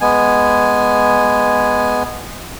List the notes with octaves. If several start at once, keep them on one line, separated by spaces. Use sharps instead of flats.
G#3 B3 G#5